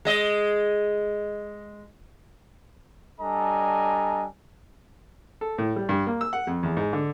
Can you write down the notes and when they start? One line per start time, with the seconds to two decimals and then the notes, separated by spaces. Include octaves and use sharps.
0.05 G#3 D#5
3.21 G3 D4 A4 D#5 G#5 A#5
5.41 A4
5.58 A2
5.76 G3
5.89 G2
6.07 A#3
6.21 E6
6.33 F#5
6.47 F2
6.63 E2
6.77 G#2
6.93 D3